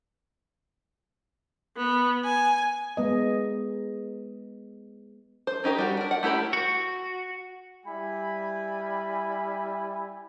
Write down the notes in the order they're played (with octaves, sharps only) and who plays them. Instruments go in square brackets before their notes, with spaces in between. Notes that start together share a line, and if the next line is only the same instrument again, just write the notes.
[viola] B3
G#5
[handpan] G#3 B3 D#5
[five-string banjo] C5
C#4 D#4 G4 A#4
G3 F#4
D4 A#4
F#5
A3 E4 G4 A#4 B5
[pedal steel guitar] F#4
[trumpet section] G3 E4 G#5 B5